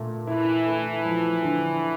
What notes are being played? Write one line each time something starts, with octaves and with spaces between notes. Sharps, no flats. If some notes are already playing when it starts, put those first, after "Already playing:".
Already playing: A#2 A3
E3 E4
A3
F3
D3